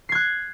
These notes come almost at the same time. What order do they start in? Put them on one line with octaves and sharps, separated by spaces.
C7 G#6 F#6